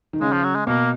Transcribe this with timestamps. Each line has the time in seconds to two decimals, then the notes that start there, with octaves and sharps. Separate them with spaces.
0.13 D#3
0.21 C#3 G#3
0.32 F3
0.44 F#3
0.55 G#3
0.67 B2 A#3